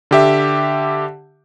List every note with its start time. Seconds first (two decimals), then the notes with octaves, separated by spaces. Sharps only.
0.11 D3 G4 E5